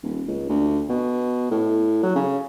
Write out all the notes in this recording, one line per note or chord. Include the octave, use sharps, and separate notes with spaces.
D#1
C#2
D2
B2
A2
F#3
C#3